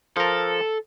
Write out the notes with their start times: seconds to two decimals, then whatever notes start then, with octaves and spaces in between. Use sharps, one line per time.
0.17 F3 A4 A#4